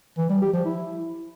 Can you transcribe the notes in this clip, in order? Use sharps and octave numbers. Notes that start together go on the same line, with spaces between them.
E3
G3
G4
F3
E4